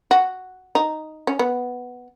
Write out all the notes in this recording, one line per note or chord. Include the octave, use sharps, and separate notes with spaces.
F#4
D#4
C#4
B3